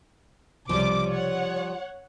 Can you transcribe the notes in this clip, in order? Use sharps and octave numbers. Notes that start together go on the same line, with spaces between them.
C2 C#3 F3 G3 D6
C#5 F#5